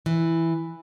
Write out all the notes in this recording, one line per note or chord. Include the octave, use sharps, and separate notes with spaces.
E3